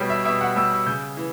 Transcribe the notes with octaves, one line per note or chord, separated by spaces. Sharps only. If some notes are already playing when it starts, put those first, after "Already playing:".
Already playing: B2 G3 C#5 D5
E5
B2 E5
F#5
G3 E6
E6
C#3 G6
E3